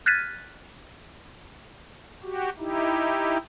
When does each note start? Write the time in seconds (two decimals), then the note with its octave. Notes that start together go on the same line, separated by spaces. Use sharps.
0.06 F6 F#6 G#6 A6 B6 D#7
2.23 F#4 G4
2.59 D#4 E4 G4